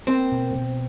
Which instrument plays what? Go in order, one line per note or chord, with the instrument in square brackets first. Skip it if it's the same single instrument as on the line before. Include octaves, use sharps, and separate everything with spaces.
[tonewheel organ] A#3 [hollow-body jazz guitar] C4
[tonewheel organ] B2
B2